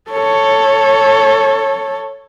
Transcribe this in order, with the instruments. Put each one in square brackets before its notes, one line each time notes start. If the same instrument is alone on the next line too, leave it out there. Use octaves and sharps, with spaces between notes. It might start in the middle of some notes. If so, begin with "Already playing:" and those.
[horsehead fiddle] A4 C#5